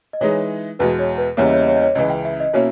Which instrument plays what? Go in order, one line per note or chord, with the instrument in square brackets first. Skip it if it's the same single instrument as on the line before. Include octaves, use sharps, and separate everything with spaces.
[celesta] D#5
[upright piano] E3 G#3 D#4 [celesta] C#5
[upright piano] E2 B2 G#3 [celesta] B4
[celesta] C#5
B4
[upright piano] E2 C#3 G3 A#3 E4 [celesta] C#5
[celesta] D#5
C#5
D#5
C#5
D#5
C#5
[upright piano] C#2 C#3 E3 [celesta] D#5
[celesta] G5
E5
D#5
[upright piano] B2 A#3 C#4 E4 [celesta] C#5